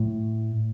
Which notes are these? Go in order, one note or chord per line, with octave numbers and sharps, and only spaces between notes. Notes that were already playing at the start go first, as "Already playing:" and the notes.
Already playing: A2